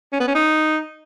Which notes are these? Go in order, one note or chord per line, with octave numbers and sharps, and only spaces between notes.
C#4
B3
C#4
D#4